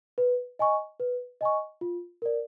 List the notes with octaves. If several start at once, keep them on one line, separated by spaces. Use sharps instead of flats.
B4
D#5 G#5 C#6
B4
D#5 G#5 C#6
F4
A#4 D5